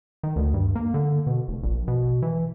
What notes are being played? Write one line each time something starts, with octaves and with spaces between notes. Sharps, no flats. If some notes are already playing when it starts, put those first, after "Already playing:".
D#3
D2
G2
A#3
D3
B2
F1
A#1
B2
E3